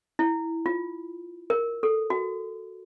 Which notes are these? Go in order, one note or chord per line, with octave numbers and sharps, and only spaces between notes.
E4
F4
A#4
A4
F#4